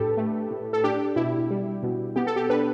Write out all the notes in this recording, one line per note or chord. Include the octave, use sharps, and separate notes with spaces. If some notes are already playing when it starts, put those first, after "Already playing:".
Already playing: A2 D4 G4 A4 B4
A3
A2
A4
D4 G4
B2 E4
G3
B2
B3 G4
A4
G4
D4 B4